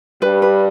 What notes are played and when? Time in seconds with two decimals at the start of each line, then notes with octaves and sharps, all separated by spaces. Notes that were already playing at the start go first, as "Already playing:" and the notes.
0.22 G2 G3 B4
0.42 B4